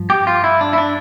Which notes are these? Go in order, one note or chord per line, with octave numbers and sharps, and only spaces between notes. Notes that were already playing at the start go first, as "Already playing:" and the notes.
Already playing: G2 F3
G4
F4
E4
D4
E4
D4